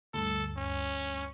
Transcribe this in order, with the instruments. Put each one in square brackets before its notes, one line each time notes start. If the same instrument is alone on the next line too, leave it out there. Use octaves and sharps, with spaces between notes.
[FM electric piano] D2 G2 [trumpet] A4
[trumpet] C#4